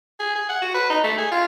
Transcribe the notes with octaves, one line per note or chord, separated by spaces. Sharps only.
G#4
G#4
F#5
F#4
B4
D#4
A3
G#4
F4